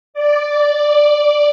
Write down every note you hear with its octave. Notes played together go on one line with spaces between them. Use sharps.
D5